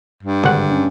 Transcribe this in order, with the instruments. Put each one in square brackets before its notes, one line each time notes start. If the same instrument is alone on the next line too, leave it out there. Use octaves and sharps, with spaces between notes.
[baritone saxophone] G2
[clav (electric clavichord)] G#1 F#5 [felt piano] D3
[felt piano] C#4